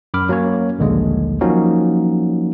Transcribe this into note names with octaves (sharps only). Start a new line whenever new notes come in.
F#2 B5 D6 F6
F#3 A#3 C#4 C#5
A#1 D#2 D3 G3 G#3
F3 F#3 A#3 C#4 D#4 F#4